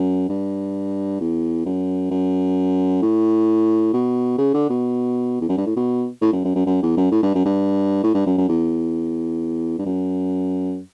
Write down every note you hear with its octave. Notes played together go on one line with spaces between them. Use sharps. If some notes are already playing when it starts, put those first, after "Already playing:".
Already playing: F#2
G2
E2
F#2
F#2
A2
B2
C#3
D3
B2
E2
F#2
G2
A2
B2
A2
F#2
F#2
F#2
F#2
E2
F#2
A2
G2
F#2
G2
A2
G2
F#2
F#2
E2
G2
F#2